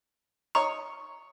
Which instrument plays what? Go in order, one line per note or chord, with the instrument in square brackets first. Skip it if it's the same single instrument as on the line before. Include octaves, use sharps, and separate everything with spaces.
[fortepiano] C#5 D#5 C#6 [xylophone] A#5